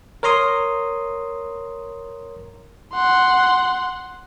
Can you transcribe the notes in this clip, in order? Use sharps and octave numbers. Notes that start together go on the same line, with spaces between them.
A#4 C#5 A#5 C6 D#6
F#5 C6